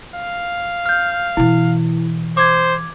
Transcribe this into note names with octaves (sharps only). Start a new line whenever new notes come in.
F5
F6 G6
B2 E3 E4
C5 D6 G#6